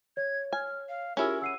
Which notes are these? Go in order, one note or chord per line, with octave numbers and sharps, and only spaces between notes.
C#5 G#6
G#5 F6
F5
C#4 E4 F4 G4 G#4 A#4 E6
F#5 E6 C7 D#7